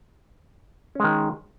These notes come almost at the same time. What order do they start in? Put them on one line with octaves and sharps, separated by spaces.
C#4 G#3 D#3